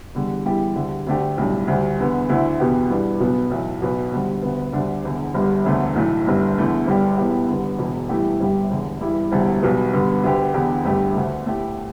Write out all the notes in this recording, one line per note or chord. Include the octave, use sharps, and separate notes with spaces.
E2 D3 G3
E2 E3 G3 E4 G4
D2 D3 G3
D2 D3 A3 D4 G4
B1 A2 G3 D4
D2 D3 G3
E2 D3 B3
D2 D3 A3 E4
E2 B2 B3 G4
G2 E3 B3 D4
B1 B2 B3
B1 A2 E3 A3 E4
B1 B2 B3
E1 D2 D3 G3
D2 D3 B3
D2 D3 G3 D4
E1 E2 D3
G1 G2 D3 G3
E1 D2 D3 A3
B1 A2 E3 A3
G1 G2 D3 G3 E4
E2 D3 A3 E4
G1 G2 G3 D4 G4
E1 E2 E3 B3 G4
G2 D3 B3
E1 E2 B2
G2 E3 A3 E4 G4
G1 G2 G3 E4 G4
E1 E2 D3
G2 E3 G3 E4
E1 D2 D3 G3 E4
B1 B2 G3 B3
G2 D3 B3
D2 D3 B3 G4
E1 E2 D3 B3 G4
G1 G2 D3 A3 G4
D2 D3 A3
A2 A3 E4 G4